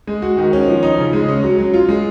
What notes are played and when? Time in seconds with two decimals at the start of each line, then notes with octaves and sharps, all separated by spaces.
0.07 G#3
0.22 F#4
0.38 D#3
0.53 C#4
0.68 F3
0.83 D#4
0.98 C#3
1.13 G#3
1.28 C#4
1.44 F#3
1.58 F#3
1.74 F4
1.89 G#3